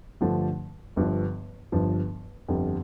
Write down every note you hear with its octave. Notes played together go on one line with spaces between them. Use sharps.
G2 D3 F3 A3 D4
G1 G2 F3
G1 G2 F3
G1 F2 D3 G3